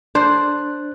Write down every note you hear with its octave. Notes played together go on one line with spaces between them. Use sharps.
D4 C5 F#6